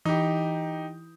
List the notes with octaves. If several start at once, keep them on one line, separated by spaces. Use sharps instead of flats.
E3 D#4 G4